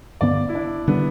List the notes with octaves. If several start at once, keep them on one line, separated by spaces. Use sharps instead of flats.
G2 D3 B3 D5
E4
D4
D3 G3 B3 D4